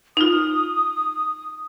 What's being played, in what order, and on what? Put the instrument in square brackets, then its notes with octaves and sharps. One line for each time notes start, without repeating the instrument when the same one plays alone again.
[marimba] D#4 F4 [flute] D#6